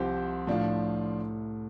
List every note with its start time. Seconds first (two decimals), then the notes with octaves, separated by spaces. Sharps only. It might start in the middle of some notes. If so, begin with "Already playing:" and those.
Already playing: C2 C3 F3 C4 G4 C5
0.47 A2 F3 D4 F4